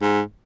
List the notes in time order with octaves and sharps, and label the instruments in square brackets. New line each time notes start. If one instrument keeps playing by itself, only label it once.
[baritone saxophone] G#2